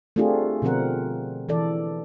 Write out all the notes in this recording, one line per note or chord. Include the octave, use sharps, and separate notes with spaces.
A3 C4 D4 F4 G4 G#4
B2 D3 F3 C4 A#4 F#5
E3 A4 D5